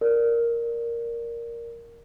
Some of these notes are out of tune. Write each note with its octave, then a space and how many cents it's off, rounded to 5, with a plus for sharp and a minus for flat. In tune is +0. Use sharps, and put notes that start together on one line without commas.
A#4 +0 D5 +0